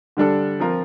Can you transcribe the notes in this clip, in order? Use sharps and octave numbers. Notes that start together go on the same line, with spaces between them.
D3 G3 D4 A4
F3 C4 F4 A#4